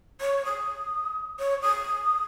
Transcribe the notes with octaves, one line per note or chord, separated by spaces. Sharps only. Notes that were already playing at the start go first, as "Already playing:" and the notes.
C#5
D#6
C#5
D#6